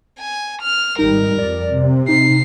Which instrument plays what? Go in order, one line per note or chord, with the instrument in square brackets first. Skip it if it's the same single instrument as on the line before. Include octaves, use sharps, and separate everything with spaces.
[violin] G#5
F6
[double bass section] G#1 G3 [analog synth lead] D#4 [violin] A#4
[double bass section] F2 [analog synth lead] D5
[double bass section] C3
[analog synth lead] D#4 [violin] C7